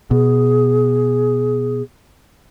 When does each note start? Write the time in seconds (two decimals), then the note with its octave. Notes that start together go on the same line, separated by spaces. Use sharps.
0.11 B2 G#4